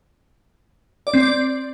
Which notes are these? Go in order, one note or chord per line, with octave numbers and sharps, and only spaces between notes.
D5
C4
D5